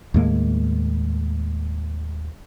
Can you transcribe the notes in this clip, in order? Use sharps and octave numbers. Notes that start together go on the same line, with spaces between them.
D#2 A2 G#3 A#3